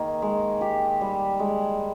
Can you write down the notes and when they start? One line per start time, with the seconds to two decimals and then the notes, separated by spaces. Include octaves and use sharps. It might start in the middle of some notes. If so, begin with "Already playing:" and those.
Already playing: D#3 A#3 G#4
0.22 G#3
0.61 G4
1.01 G3
1.40 G#3